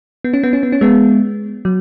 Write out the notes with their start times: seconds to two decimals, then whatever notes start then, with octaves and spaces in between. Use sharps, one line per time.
0.24 B3
0.34 C#4
0.43 B3
0.53 C#4
0.63 B3
0.72 C#4
0.81 G#3 B3
1.65 F#3